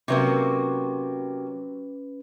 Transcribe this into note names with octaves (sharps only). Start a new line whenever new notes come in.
C3 F#3 A#3 C#4 B4